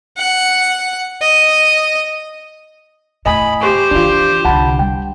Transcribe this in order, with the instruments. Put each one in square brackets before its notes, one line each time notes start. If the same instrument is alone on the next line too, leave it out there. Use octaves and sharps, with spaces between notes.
[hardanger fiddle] F#5
D#5
[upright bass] E2 A2 [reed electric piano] D#5 G#5 D#6 [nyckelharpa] B5
[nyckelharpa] G4 C5
[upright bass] D#3 E3 [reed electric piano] D4 F4
[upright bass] C2 D3 [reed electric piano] F#5 A5 B5
[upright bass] G3 [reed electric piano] G5